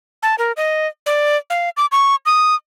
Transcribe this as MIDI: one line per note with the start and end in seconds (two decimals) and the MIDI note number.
0.23 0.35 81
0.38 0.52 70
0.57 0.87 75
1.06 1.37 74
1.50 1.70 77
1.77 1.86 86
1.92 2.16 85
2.26 2.55 87